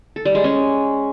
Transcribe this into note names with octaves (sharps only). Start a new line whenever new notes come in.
A4
G3
G#3
C#4